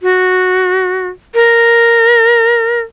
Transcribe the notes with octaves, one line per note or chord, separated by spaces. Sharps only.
F#4
A#4